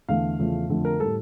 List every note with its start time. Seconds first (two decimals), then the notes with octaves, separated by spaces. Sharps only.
0.09 E2 D3 A3 F5
0.39 E2 C#3 F3 A3
0.69 F2 D3 A3
0.85 A#4
1.00 A2 G3 A4